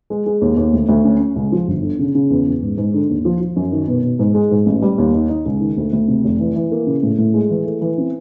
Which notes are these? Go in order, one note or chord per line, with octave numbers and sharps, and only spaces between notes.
G#3
G#3
D#2
D#2
D2
D2
C#4
C#4
C#2
F3
G1
D3
C#3
C#3
E2
E2
G#2
G#2
D3
D#2
F3
F3
F#2
D#3
B2
B2
G#2
G#3
G#2
A1
G3
D#2
D#4
D#4
C#2
D#3
D2
D2
C3
F1
E3
E3
A#3
C#3
A2
A2
G#3
E3
A3
E3
C4